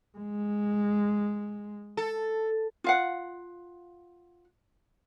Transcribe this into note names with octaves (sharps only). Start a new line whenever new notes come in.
G#3
A4
F4 F5 F#5